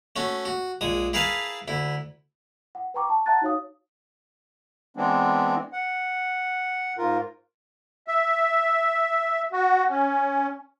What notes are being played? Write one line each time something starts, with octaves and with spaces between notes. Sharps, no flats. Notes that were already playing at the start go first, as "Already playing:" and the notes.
A3 C#4 F#4
F#4
A#1 G#3 D#6
E4 G#4 A#4 B4 F5 A5
D2 E4
F#5
B4 G5 A#5 C#6 D6
A5
E5 F#5 A5 A#5 F#6 A6
D#4 F#4 C#5 F5 D#6
E3 G#3 B3 C4 D4
F#5
G#2 F4 A#4
E5
F#4
C#4